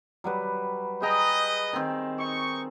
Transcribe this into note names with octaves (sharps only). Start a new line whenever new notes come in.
F#3 G3 B4
G#4 B4 D#5 G5 A#5
D#3 C4
D#4 C#6